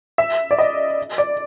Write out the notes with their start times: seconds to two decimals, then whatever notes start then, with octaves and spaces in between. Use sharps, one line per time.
0.18 E5
0.51 D5
0.59 D#5
1.18 D5